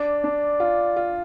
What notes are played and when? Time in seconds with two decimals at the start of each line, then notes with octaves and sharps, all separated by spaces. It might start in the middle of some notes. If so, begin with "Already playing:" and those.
Already playing: D4 D5
0.24 D4
0.60 F4
0.96 F4